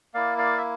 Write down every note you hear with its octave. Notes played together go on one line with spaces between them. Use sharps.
A#3 E4 D5 F5
D5 F5
E5